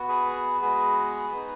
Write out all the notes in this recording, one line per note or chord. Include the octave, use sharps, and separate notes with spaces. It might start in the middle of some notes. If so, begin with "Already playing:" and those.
Already playing: B3 F#4
G#4 B4
G#3 B3 F#4 G#4 B4
B3 D#4 G#4